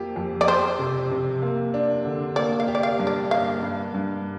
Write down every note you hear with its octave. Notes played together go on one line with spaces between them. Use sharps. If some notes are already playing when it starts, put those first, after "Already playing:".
Already playing: F2 A#3 G4
F2
D5
G4 C5
C3
C3
A#3
D4
D3
A#3 D5
F5
G4
D5
F5
G2
D5
A#3 F5
G2
G2